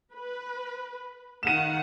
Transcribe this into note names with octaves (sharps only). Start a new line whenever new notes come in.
B4
D#3 F5 F#5 D#7 E7